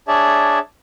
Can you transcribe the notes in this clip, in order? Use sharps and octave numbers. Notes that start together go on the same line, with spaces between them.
D4 G#4 C#5 D5 E5 A5